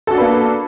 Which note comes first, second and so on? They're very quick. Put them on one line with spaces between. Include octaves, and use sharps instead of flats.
A4 F#4 D4 B4 A#3